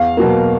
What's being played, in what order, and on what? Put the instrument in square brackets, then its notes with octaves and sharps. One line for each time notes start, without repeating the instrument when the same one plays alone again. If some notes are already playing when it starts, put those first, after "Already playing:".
Already playing: [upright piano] E2 F5
B2 F#3 A#3